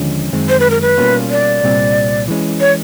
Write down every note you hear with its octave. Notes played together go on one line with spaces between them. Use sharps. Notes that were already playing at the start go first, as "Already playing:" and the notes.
Already playing: D#2 D3 F3 G#3 C#4
F#2 D#3 G#3 C4
C5
B4
A#4
B4
B2 G3 A#3 C#4 F4
D5
C2 A#2 G3 C4
E3 G#3 C#4
C#5